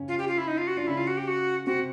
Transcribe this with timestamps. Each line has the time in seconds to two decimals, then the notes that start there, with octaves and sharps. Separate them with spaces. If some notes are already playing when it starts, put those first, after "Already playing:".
Already playing: C#3 C#4
0.08 F4
0.18 G4
0.28 F4
0.38 E4
0.48 D#4
0.58 F4
0.67 F#4
0.77 D4 F4
0.87 C#3 C#4 E4
0.97 F4
1.07 F#4
1.17 G4
1.27 F#4
1.66 C3 C4 F#4